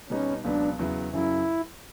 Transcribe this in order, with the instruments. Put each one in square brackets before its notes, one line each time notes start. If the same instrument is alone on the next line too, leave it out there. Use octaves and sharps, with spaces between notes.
[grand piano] B2 G3 B3 D#4 [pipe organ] C#4
[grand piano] C#2 B2 F#3 B3 [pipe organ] D4
[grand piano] E2 C#3 F#3 B3 E4
[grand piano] F#2 C#3 F#3 [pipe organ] E4